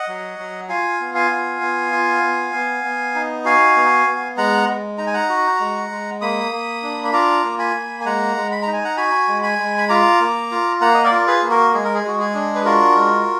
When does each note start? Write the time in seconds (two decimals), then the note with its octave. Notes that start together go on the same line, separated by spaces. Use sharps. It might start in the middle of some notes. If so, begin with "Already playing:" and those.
Already playing: D#5 F#5
0.08 F#3
0.39 F#3
0.69 F4 F5 G#5
1.00 B3
1.15 F5 G#5
1.31 F4
1.61 B3
1.92 F4
2.23 B3
2.53 B3
2.84 B3
3.15 D#4
3.45 F#4 F5 G#5
3.76 B3
4.07 B3
4.37 G#3 F#5 A#5
4.68 G#3
4.98 D#4 A#5
5.07 G#5
5.14 F#5 A#5
5.29 F#4
5.60 G#3
5.91 G#3
6.21 A#3 B5 D#6
6.52 A#3
6.83 D4
7.04 B5
7.13 F4 A#5 D6
7.44 A#3
7.59 G#5 B5
7.75 A#3
8.00 G#5
8.05 G#3 F#5 A#5
8.36 G#3
8.52 B5
8.62 D#4 A#5
8.73 G#5
8.84 F#5 A#5
8.97 F#4 G#5 B5
9.28 G#3
9.43 G#5 B5
9.59 G#3
9.78 B5
9.89 F4 A#5 D6
10.20 A#3
10.51 F4
10.81 A#3 F#5 A#5
10.94 D#5
11.04 A#4 D5
11.11 F4
11.27 G#4 B4
11.43 A#3
11.50 F#4 A#4
11.74 G#3 G#4
11.84 A#4
11.94 G#4
12.04 G#3 F#4
12.19 G#4
12.35 D4
12.55 B4
12.65 F4 F#4 A#4
12.95 G#3